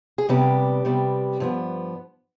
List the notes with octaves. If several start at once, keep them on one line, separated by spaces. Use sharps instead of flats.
G#4
C3 G3 B3 D4 G4
C3 G3 B3 D4
G2 F3 B3